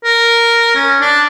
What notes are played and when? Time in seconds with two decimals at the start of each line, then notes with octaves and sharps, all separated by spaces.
0.04 A#4
0.76 C#4
1.01 D4